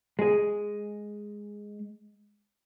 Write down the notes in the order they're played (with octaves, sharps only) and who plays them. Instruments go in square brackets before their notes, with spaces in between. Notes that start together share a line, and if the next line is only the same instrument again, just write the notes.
[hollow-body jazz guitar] G#3 G#4